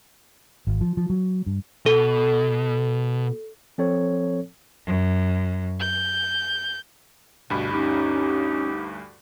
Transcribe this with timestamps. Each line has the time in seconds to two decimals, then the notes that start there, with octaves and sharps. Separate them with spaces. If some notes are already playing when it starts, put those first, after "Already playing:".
0.67 G#1
0.81 F3
0.97 F3
1.10 F#3
1.46 G2
1.86 B2 A4
3.78 F3 C4 A4 C#5
4.85 F#2
5.80 G6
7.50 D2 G2 B2 B5
7.72 C#4 D#4 G4